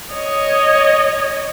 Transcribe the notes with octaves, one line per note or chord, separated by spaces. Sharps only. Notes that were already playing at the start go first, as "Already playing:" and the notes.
C#5 D#5